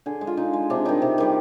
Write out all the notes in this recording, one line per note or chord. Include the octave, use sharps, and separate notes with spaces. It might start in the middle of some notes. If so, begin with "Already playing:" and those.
D3 G#4
G#3
F4
D3 D#4
G#3
C3 D4
D#3 G3 D#4
C3
D#3 G3